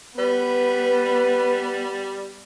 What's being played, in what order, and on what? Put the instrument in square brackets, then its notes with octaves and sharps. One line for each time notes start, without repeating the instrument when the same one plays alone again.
[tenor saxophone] G3 [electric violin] B3 [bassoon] B4